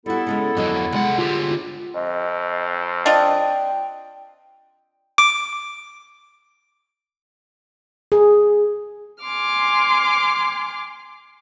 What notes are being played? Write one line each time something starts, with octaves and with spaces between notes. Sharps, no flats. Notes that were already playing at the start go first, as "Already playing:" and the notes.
G3 B3 E4 F#4 A4
C#3 G#3 C#4
F2 D3 F#3 F#4 D#5
C2 G#3 F#5
D3 F4 G4
F2 D#5
D4 F4 D#5 G5
D6
G#4
G#5 C6 D6 F6